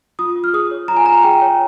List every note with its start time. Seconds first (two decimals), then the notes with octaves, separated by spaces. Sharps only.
0.19 F4 D#6
0.36 F4
0.44 F6
0.53 G#4 D#6
0.71 C#5
0.88 F4 A#5
0.97 G#5
1.06 F4 A#5
1.23 G#4 G5
1.42 C#5